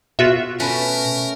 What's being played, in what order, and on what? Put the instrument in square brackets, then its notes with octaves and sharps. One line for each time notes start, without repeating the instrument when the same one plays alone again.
[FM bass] B2 [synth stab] F4 F#4 E5
[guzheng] A3 C#4 B4 [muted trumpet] A#4